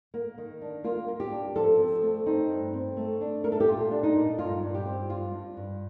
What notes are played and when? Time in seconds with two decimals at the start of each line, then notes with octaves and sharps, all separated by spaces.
0.14 A#3
0.38 D#3
0.61 D4
0.84 A#3 F4
1.08 A#3
1.20 G4
1.32 D4
1.55 F3 A4
1.79 C4
2.02 A3
2.26 C4 D#4
2.50 G2
2.74 C4
2.97 A3
3.21 D4
3.44 A3 A#4
3.52 A4
3.60 G4
3.68 A#2 F4
3.91 D4
4.03 D#4
4.16 A#2
4.38 G2 F4
4.63 G2
4.74 G4
4.86 C4
5.09 G2 F4
5.33 G2
5.57 G2